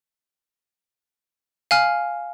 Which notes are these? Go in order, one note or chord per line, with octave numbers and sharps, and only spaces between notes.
F5 G#5 F6